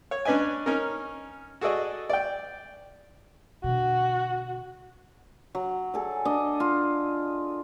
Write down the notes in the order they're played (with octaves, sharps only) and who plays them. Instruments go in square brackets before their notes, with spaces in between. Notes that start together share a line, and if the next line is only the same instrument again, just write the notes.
[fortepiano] C#5
C#4 D4 B4 D#5 G#5
C#4 D#4 A#4
F#4 G#4 A4 D5 D#5
D5 G5
[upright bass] B2 D3 [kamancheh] F#4
[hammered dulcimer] F#3
G#4 A4 D5
D4 D#5
F4